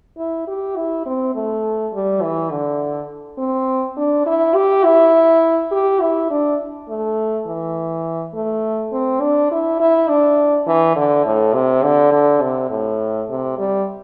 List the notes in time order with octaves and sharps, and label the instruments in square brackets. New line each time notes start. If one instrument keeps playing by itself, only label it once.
[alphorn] E4
G4
E4
C4
A3
G3
E3
D3
C4
D4
E4
G4
E4
G4
E4
D4
A3
E3
A3
C4
D4
E4
E4
D4
E3
D3
A2
C3
D3
D3
C3
A2
C3
G3